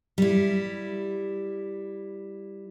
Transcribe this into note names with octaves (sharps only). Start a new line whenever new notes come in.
G3 E4